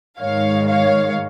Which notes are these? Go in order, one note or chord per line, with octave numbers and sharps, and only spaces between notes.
G#2 D#3 G#3 C#5 F5
C#5 F5